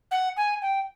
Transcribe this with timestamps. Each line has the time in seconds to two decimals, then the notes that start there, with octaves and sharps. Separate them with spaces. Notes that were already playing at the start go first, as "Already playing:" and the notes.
0.11 F#5
0.37 G#5
0.62 G5